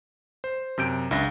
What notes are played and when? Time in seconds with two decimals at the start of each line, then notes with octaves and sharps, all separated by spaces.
0.44 C5
0.78 F#2 C3 G6 D7
1.11 C#2 D4 E5 B5 A#6